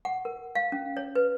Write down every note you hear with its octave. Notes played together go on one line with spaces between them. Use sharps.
F#5
A#4
F5
C#4
C#5
B4